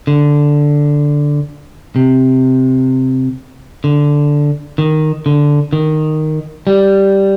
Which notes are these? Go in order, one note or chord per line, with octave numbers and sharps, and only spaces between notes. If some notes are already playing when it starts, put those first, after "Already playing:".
D3
C3
D3
D#3
D3
D#3
G3